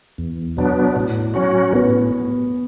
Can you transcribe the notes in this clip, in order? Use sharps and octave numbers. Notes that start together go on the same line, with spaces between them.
E2
B2 F#3 B3 D4
A2
F#3 C#4 F#4
A2 B3